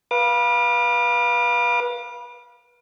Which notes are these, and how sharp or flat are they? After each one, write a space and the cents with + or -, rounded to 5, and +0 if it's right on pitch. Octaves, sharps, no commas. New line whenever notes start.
B4 -25 F5 +0 D6 +35